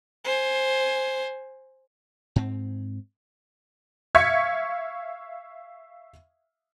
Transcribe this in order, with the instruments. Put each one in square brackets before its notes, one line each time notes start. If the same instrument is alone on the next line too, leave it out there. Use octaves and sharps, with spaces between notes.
[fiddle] C5 G#5
[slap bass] G#2 C4
[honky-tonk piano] E5 F5 C#6 G#6 B6 C#7